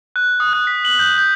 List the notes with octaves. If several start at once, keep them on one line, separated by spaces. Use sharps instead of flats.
F#6
D#6
F#6
B6
F#7
G6
G6